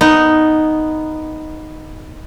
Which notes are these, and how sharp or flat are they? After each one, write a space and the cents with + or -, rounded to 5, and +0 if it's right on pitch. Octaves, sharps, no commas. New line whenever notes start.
B3 +0 D#4 +0